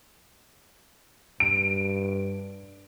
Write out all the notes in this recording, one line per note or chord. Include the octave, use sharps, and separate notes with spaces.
G2 D7